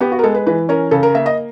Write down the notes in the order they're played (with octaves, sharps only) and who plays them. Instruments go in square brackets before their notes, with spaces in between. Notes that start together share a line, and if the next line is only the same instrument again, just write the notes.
[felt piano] B3 G4
F#4
A#4
G#3 A4
B4
E3 B4
C#4 A#4
C#3 A4
A#4
A#3 E5
D#5